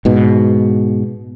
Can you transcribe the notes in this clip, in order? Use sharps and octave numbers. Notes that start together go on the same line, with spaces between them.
G#2 B2